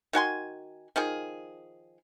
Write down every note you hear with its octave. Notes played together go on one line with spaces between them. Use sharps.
D#3 F#4 G#5 C6
D#3 F3 G#4